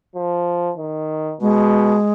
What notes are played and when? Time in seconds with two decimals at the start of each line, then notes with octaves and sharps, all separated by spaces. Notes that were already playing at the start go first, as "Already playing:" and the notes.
0.15 F3
0.77 D#3
1.41 B2 G#3